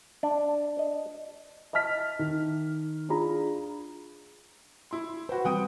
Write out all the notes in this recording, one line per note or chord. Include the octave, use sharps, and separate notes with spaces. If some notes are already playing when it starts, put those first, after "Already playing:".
D4
D#5
D#5 E5 A5 F6 B6
D#3
D4 F4 G#4 A#5 B5
E4 C6
F#4 B4 C5
E3 G3 C4 F#5 G5 D#6